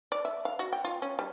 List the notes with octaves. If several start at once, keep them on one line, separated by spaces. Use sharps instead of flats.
D5
E5
F5
F#4
G5
F4
C#4
G3